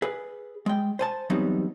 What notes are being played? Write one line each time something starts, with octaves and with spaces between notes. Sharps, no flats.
G#4 B4
G#3 G5
C5 G#5 A5
E3 F#3 G3 B3 C4 D#4